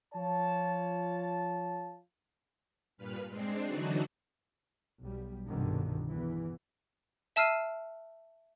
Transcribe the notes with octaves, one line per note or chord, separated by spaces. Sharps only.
F3 F4 C#5 A5
G2 A#2 B4 F6
G#3 C4 D4 C7
D3 E3 F#3 D4 D#4 F#4
B1 G3
G1 C2 G2 B2 D3 D#3
E2 E3
E5 A5 E6 F6 C7 D#7